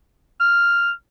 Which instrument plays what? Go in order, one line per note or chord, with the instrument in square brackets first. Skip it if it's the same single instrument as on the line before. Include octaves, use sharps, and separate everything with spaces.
[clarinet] F6